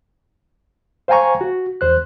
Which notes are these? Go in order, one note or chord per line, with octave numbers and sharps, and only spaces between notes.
C5 F5 G5 G#5 A#5 C#6
F#4
E2 C5 F#6